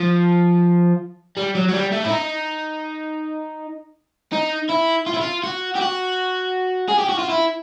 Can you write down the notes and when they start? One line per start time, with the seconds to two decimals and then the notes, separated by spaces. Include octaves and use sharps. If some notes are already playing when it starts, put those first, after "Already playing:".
Already playing: F3
1.37 G3
1.55 F#3
1.69 F#3
1.74 G3
1.92 A3
2.04 E4
2.10 D#4
4.33 D#4
4.70 E4
5.07 F4
5.14 E4
5.21 F4
5.44 F#4
5.76 G4
5.81 F#4
6.89 G#4
6.99 G4
7.09 F#4
7.19 F4
7.30 E4